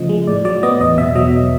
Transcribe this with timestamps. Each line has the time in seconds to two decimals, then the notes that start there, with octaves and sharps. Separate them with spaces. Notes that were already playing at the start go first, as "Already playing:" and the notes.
Already playing: C#3 F3 A3 D#5
0.09 G#3
0.27 A2 D5
0.45 F#3 D5
0.63 B3 D#5
0.80 E2 D#5
0.98 B2 E5
1.15 F#3 D#5